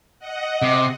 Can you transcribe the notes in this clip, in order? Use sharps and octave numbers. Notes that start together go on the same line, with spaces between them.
D#5 F#5
C3